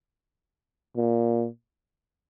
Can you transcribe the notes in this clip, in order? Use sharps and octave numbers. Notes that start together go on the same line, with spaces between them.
A#2